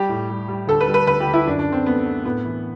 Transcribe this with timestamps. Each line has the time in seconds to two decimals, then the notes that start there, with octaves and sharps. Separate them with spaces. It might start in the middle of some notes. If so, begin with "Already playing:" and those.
Already playing: G3 G4
0.09 A2
0.29 G3
0.48 G3
0.67 D2 A4
0.81 B4
0.87 G3
0.94 B4
1.07 D2 B4
1.20 G4
1.26 D2
1.33 E4
1.47 F#2 D4
1.59 D4
1.66 D3
1.72 C4
1.86 A3 B3
2.05 A3
2.25 A2 B3
2.45 E3